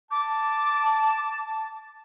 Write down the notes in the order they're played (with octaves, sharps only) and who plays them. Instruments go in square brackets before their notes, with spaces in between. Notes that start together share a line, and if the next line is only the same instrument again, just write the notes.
[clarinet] A5 [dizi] D6